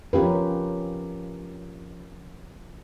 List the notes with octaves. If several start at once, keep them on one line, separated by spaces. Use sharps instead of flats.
F3 C#4 F4 G4 A#4 B4